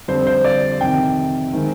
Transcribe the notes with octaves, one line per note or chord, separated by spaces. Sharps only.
F2 D3 G3 C4 C5
C5
D5
F2 C3 D#3 G5
D#3 G#3 C4